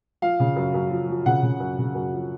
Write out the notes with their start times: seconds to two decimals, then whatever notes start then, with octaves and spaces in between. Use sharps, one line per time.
0.22 F3 F5
0.40 C#3
0.56 F#2
0.74 F#2
0.91 F3
1.09 F3
1.26 C#3 F#5
1.43 C#3
1.60 F#2
1.78 C#3
1.95 F#2
2.13 F3